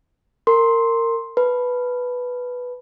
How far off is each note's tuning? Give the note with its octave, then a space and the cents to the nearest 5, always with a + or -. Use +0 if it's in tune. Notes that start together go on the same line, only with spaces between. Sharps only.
A#4 -25 C6 +5
B4 +0 A5 +0